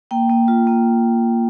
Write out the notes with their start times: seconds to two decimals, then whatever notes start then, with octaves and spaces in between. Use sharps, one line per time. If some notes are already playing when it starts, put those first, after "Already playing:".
0.11 A#3 G5
0.30 A#3
0.48 F4
0.67 A#3